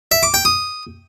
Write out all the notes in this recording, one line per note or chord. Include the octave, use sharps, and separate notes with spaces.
E5
D6
G5
D#6